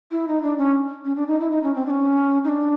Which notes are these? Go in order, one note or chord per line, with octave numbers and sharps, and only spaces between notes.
E4
D#4
D4
C#4
C#4
D4
D#4
E4
D#4
C#4
C4
D4
C#4
D#4
D4